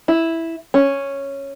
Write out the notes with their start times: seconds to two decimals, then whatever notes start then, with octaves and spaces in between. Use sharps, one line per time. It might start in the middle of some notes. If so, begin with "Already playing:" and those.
0.08 E4
0.74 C#4